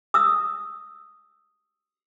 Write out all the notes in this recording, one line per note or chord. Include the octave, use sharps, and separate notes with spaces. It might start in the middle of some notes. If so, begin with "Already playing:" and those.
D#6 E6